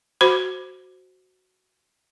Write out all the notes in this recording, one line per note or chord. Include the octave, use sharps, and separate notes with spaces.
F#4 C5 B5